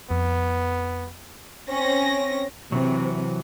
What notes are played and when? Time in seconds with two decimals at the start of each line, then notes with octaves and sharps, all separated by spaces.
0.11 F2 B3
1.69 C4 C#4 A#6
2.72 C3 E3 F#3